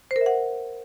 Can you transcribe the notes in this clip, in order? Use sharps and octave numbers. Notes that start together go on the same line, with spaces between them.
C5
A#4
E5
F#5